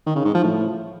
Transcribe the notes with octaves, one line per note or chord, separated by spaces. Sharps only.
D#3
C#3
G#2
F3
A2